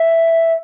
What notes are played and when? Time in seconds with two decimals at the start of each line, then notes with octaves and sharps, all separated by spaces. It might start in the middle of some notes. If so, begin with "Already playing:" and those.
Already playing: E5